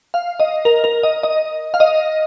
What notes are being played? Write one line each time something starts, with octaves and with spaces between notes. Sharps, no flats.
F5
D#5
A#4
A#4
D#5
D#5
F5
D#5